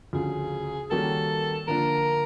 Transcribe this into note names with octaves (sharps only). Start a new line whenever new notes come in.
D2 C#3 F3 G#4
D#3 G3 A#3 C#4 F#4 A4
D3 F3 A#3 D4 A#4